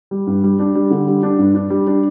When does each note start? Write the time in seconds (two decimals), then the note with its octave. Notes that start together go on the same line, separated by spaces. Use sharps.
0.11 G3
0.27 G2
0.44 G3
0.59 D4
0.75 G3
0.90 D3
1.07 G3
1.23 D4
1.39 G2
1.55 D4
1.70 G3
1.87 D4